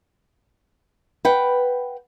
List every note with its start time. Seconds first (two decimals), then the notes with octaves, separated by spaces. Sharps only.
1.25 B4 F#5 G5